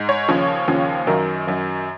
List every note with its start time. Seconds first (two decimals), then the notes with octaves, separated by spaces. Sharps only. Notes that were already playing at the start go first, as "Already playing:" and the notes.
Already playing: G#2
0.09 C#5
0.28 D#2 C#3 F3
0.68 D#2 C#3 F3
1.07 F#2 D#3 F#3 A#4
1.47 F#2 D#3 F#3